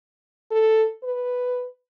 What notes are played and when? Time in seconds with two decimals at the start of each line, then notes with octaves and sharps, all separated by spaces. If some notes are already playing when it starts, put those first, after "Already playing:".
0.51 A4
1.04 B4